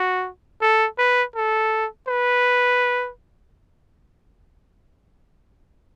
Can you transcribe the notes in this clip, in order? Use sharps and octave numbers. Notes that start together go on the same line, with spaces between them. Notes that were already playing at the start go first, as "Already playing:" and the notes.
Already playing: F#4
A4
B4
A4
B4